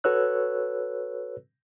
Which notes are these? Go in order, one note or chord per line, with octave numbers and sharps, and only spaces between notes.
F#4 A4 B4 C#5 E6 F#6